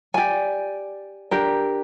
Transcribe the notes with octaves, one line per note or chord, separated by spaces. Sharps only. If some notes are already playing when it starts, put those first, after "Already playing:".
G4 D5 G#5
D4 G4 A#4